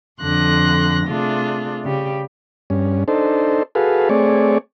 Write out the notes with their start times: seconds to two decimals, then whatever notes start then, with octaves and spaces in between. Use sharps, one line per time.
0.20 F2 D3 C6 F#6 A#6
1.06 C3 A3 D4 F4 G#4
1.85 C#3 G3 G4
2.70 G2 C#4
3.08 D4 D#4 A4 C5
3.75 F#4 G#4 A4 B4 F5
4.09 A3 C4 G#4 C#5 D5